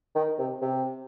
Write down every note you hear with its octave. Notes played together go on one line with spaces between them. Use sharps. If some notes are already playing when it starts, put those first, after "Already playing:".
D#3
C3
C3